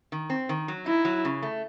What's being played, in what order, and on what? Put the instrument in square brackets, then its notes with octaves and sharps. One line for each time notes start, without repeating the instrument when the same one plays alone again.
[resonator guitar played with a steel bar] D#3
C4
D#3
F#3
[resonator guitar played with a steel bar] D#4 [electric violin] E4
[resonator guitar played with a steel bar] F#3
C#3
A3